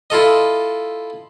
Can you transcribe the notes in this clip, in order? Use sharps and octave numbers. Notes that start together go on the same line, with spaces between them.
E4 F4 A4 D#5